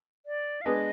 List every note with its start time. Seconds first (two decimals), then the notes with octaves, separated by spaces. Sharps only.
0.26 D5
0.61 F5
0.65 G#3 B3 D4 G#4 B4 D#5